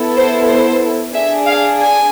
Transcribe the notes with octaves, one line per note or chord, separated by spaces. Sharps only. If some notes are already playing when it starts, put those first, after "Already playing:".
Already playing: B3 E4 A4
C5
C5
D4 G#4 E5
F5
G#5